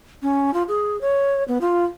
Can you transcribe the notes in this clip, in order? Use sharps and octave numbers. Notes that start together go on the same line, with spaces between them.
C#4
F4
G#4
C#5
B3
F4